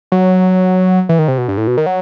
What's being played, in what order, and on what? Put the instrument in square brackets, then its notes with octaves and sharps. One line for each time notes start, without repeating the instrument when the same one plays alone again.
[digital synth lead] F#3
E3
D#3
C3
B2
G2
A2
B2
D#3
F#3